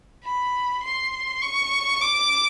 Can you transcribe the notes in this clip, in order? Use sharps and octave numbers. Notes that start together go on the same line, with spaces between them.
B5
C6
C#6
D6